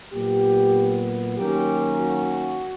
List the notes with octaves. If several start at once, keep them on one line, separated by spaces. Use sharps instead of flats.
A#2 F#3 B3 G4
D#3 F#3 A#3 C#4 G4
F#4